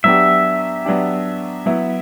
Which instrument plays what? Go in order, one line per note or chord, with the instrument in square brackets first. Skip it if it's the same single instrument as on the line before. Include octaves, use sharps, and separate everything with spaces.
[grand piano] F#3 B3 D4 G4 [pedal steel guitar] E5
[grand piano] F#3 B3 D4 G4
F#3 B3 E4